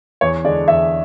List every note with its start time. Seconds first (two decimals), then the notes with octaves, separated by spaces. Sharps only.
0.21 E2 C#5
0.44 D3 G#3 D4 D5
0.68 E2 E5